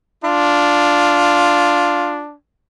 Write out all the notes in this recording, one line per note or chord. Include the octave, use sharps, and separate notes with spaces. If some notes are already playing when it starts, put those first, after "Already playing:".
D4 F4